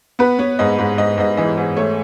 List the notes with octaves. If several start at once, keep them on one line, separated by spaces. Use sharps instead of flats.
B3 B4
B3 C#5
G#2 D#5
G#2
G#2 D#5
G#2 D#5
E3 D#5
G#2
A3 C#5